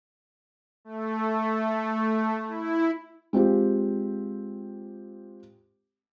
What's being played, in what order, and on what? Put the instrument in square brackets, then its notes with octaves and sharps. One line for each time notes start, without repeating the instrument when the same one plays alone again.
[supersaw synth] A3
E4
[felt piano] G#3 C4 F4 G4